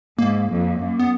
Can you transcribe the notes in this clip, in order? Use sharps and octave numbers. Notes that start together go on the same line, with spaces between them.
G#2 A#3
F2
F#2
B3